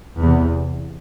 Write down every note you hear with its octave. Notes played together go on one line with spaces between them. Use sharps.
E2 C3 B3